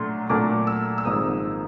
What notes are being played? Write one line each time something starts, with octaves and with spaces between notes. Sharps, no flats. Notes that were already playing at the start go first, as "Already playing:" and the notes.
Already playing: A#2 F#3 A3 D4 C6
A#2 F#3 A3 D4 D6
E6
E6
G#1 G#2 F3 A#3 D#6